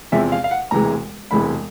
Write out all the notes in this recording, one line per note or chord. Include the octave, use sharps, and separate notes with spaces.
E2 C3 F3 G#3 C4 E5
F5
F5
F#5
E1 D2 C3 E3 G#3 A#5
E1 D2 C3 E3 G#3 B5